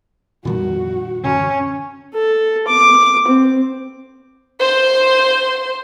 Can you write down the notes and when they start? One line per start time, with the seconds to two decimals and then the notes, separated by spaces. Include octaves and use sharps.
0.45 F2 A#2 D#3 G3 B3 F#4
1.24 F#2 D3 E3 C#4
2.14 A4
2.67 D6
3.28 C4
4.60 C5 C6